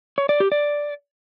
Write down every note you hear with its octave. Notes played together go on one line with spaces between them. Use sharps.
C#5
D5
G4
D5